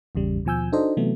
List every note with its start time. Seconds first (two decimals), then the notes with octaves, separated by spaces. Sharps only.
0.15 G#1 E2 C#3 G3
0.45 D#2 B2 F3 G#5 E6 G6
0.72 D4 D#4 F#4 A4 C5 D#5
0.97 C3 E3 F#3 A3 B3